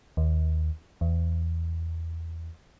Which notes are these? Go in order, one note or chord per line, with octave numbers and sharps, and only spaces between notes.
D#2
E2